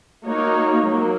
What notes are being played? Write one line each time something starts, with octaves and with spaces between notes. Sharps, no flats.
A#3 D#4 F#4 C#5
F#3 A#3